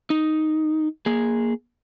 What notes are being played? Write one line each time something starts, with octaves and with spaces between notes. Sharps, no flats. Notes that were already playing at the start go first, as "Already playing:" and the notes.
D#4
A#3 G#4